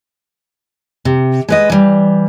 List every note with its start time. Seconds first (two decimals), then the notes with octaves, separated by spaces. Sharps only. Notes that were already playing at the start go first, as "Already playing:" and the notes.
1.05 C3
1.49 G#3 B4 D#5
1.70 E3 G3